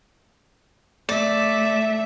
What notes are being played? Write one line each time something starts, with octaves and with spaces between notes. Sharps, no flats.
A3 D5 E5